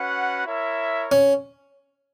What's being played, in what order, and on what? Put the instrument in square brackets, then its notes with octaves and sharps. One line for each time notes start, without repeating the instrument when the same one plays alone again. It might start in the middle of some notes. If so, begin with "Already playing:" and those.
Already playing: [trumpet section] C#4 F#4 B4 F#5
E4 A#4 C#5 E5
[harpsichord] C#4